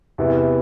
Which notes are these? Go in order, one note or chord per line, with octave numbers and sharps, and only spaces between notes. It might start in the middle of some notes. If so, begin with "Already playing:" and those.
E2 C3 E3 B3 E4